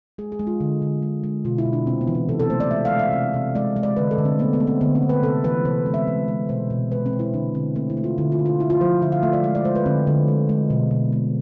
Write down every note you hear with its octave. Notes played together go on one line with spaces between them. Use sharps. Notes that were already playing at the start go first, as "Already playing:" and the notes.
G#3 G#4
G#4
G#3
F4
D3
D3
G#3
G#3
B2 F4
E4
B2
D4
C3 C4
B3
E3
C4
C3 A4
A4
A3 C5
D5
G#3 E5
F5
G#3
E5
C3
C3
G#3 D5
G#3
D5
D3 B4
A4
D3
C4
A3 B3
B3
A3
C4
D3 B3
C4
D3
B4
C3 A4
E3 B4
C3 C5
G#3
E5
G#3
G#3
B2 C5
B2
G#3 B4
C4
G#3
E4
D3 D4
D3 C4
A3 C4
E4
A3
F4
D3 E4
F4
D3
F4
D3 E4
F4
F3 C5
D3 E5
F5
A3 E5
D5
G#3 F5
D5
G#3 C5
B4
D3 C4
D3
G#3
G#3
B2
B2
G#3